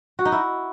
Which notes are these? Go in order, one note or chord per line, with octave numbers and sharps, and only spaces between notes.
F#4
D#4
E4